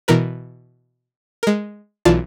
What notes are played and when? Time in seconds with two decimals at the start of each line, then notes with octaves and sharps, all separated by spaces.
0.08 B2 E3 A#4 B4
1.43 G#3 A#4
2.05 B1 E3 F4 D5 A5